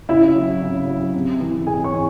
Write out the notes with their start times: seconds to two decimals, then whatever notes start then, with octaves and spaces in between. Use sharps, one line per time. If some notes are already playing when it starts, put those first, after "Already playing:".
0.09 C#3 E4 E5
0.35 F#3
0.61 C#3
0.88 F#3
1.14 C3
1.41 E3
1.66 C3 G#4 G#5
1.84 C#5 C#6
1.93 E3